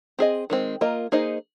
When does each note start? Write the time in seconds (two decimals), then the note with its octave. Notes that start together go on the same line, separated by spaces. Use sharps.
0.19 C4 G#4 D#5
0.50 D#3 G#3 C4
0.81 A#3 F4 A#4 D#5
1.12 A#3 D#4 G#4 C5 D#5